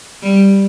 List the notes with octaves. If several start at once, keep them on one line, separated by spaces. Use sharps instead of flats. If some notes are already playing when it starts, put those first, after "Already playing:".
G3